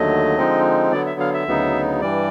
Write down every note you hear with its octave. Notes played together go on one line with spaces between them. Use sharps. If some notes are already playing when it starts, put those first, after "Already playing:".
Already playing: D#2 D3 F#3 A3 D#5
D3 F3 G#3 C4 D#4
D3 F#3 B3 D5
E5
F5
E5
D2 C#3 F#3 B3 D#4
G2 E3 G3 D5